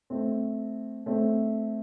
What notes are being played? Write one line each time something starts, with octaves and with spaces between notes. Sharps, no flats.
A3 C4
A3 C4